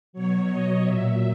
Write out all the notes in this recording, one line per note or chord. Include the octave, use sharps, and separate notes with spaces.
B2 F#3 C#5
D#5
A#2 F#3 E5